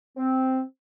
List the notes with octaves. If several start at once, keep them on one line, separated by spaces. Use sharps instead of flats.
C4